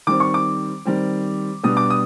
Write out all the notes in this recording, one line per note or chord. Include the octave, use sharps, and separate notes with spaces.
D#3 G3 C4 D6
C#6
D6
D#3 G3 C4
B2 G3 B3 D4 D#6
D6
D#6